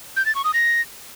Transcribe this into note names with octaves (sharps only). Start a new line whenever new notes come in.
G6
A6
C#6
D#6
A#6